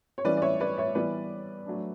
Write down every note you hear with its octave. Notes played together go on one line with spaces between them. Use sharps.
C#5
E3 G3 C#4 E4 B4 D5
D5
C#5 E5
B4 D5
C#5 E5
E3 G3 B3 E4 B4 D5
F#3 A3 D4